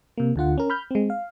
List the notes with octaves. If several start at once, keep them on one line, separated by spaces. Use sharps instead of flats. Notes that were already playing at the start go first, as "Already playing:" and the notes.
C3 A#3
D2 D3 F4 F#5
C#4 A#4
B5 F6 G6
G#3 C4
F5